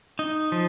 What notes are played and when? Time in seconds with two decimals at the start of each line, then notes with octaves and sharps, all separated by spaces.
0.19 D#4
0.52 F3